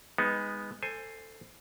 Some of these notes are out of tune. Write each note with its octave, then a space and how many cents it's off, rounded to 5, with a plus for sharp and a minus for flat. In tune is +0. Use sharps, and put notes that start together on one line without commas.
G#3 -20 B3 +0 D#4 +0
A4 +20 C5 +0 G#5 +0